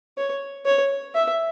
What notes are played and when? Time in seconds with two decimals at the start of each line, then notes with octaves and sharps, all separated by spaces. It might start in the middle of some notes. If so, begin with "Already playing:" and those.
0.17 C#5
0.65 C#5
1.15 E5